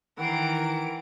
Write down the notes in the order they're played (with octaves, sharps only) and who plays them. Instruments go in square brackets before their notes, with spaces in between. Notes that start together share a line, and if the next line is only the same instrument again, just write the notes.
[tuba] D#3 [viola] E3 [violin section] A#4 D7 [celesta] F#5 G5 C7